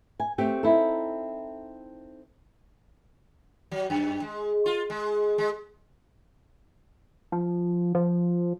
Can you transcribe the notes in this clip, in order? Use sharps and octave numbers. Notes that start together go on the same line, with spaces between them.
G#5
A3 C4 G4
C4 D#4 E4 A4
F#3
F#2
G#3
F4
G#3
G#3
F3
F3